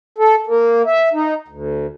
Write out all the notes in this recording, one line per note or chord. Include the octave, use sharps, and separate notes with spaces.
A4
A#3
E5
D#4
D2